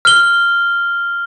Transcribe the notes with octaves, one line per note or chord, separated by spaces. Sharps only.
F6 G7